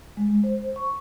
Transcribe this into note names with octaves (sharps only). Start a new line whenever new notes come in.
G#3
C5
C#6